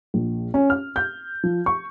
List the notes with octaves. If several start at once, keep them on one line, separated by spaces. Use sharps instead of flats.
A#1
C#4
F6
G6
F3
C#6